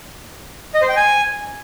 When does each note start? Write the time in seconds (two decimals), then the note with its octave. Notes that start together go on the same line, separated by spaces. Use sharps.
0.75 D#5
0.82 C5
0.89 G5
0.96 G#5